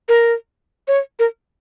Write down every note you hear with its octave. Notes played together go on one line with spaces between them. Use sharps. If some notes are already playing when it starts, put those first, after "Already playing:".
A#4
C#5
A#4